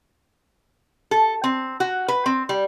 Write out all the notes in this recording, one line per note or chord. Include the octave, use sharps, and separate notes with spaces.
A4
C4
F#4
B4
C4
G3